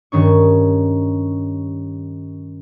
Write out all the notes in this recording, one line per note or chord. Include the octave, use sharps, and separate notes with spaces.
G2 D#3 C#4 C#6